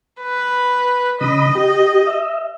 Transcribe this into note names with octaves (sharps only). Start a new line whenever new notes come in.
B4
C#3 D#5 B5 D#6
G4
E5